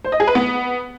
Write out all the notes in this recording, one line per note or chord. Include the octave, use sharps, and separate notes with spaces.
C5
D#5
G#4
B4
B3